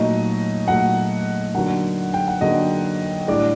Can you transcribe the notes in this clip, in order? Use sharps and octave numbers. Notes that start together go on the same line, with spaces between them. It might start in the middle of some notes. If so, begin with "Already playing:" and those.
Already playing: A#2 F#3 A3 D#4 D#5
A#2 F#3 A3 D#4 F#5
D3 F#3 A#3 D#4 F#5
G5
F#5
D3 F#3 A#3 D#4 D#5
A2 G3 D4 D5